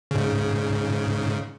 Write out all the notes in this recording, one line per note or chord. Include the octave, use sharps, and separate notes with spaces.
G#2 C#3